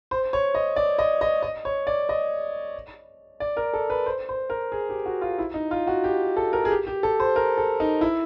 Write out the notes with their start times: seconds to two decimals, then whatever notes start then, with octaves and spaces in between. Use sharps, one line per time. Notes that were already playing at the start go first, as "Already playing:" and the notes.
0.11 C5
0.33 C#5
0.55 D#5
0.76 D5
0.99 D#5
1.21 D#5
1.42 D#5
1.65 C#5
1.87 D5
2.09 D#5
3.40 D5
3.57 A#4
3.73 A4
3.90 B4
4.06 C5
4.29 C5
4.50 A#4
4.72 G#4
4.89 G4
5.06 F#4
5.21 F4
5.39 E4
5.54 D#4
5.71 F4
5.87 F#4
6.04 G4
6.37 A4
6.53 A#4
6.65 G#4
6.71 G4
6.87 G4
7.03 A4
7.20 C5
7.36 A#4
7.57 A4
7.80 D#4
8.01 E4